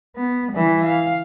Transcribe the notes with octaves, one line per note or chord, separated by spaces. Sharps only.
B3
E3 G3
F5